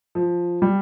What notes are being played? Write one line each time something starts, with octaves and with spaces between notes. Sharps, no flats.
F3
G3